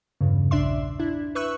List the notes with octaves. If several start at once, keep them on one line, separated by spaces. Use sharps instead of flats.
E2 G2 C#3
A#1 D4 D5 E5 C6
D4 E4
B4 E5 C#6 E6 F#6